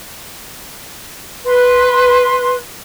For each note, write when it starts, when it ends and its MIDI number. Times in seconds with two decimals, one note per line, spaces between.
1.45 2.57 71
1.45 2.57 84